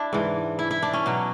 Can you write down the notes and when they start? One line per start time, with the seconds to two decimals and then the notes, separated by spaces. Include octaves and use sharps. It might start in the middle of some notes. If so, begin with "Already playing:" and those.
Already playing: D4 E4
0.13 G#2 E3
0.59 E4
0.71 E4
0.82 D4
0.94 C#4
1.06 B2 F#3